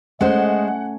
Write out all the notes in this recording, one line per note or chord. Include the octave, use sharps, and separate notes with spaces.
G#3 A3 C#4 C5 D#5 F#5